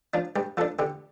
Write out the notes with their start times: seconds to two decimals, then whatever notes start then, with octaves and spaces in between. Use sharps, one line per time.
0.14 F3 D4
0.36 G2 G4
0.57 F3 A4
0.61 D4
0.79 D3 G4